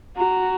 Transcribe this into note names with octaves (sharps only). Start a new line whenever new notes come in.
F#4 A#5